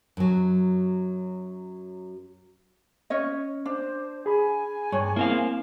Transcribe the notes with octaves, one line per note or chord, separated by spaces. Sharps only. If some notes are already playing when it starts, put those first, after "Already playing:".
F#2 F#3
C#4 C#5 D#5
D4 C5
G#4 G#5 B5
G2 C#5
A#3 C4 E4 F5